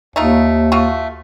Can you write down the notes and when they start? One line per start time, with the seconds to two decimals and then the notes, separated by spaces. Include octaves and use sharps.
0.16 D#2 A3 D#4 F4
0.72 A3 F4 F#4